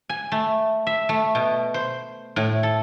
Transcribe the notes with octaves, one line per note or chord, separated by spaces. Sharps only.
G#5
A3
E5
A3
B2
C5
A2
A4